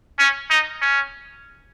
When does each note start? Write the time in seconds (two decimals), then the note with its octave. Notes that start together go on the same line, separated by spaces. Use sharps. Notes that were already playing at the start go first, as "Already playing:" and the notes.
0.19 C#4
0.50 D#4
0.81 C#4